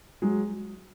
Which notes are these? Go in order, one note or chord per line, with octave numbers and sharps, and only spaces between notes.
F#3 G#3